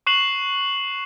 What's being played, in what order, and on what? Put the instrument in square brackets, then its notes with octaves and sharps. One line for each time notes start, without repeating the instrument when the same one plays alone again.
[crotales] C#6 F#6 C7 E7 F#7